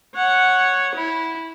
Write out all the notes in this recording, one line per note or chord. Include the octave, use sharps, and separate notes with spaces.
C#5 F#5
E4